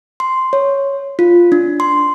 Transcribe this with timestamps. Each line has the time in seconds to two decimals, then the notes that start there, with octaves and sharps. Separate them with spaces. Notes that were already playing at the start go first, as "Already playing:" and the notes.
0.20 C6
0.53 C#5
1.19 F4
1.52 D4
1.80 C6